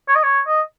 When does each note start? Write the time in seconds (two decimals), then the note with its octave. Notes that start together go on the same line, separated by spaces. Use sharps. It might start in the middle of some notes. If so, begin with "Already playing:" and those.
0.08 C#5
0.15 D#5
0.23 C#5
0.47 D#5